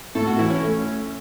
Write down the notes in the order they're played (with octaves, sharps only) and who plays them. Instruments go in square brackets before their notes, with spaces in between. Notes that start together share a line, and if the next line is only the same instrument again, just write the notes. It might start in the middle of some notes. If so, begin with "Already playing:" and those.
[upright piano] A2 [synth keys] A4
[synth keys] F#4
[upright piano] E3 [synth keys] E4
[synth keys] C#4
[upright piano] A3